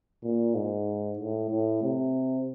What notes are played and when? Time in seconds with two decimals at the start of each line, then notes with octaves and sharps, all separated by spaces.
0.23 A#2
0.55 G#2
1.19 A2
1.51 A2
1.83 C3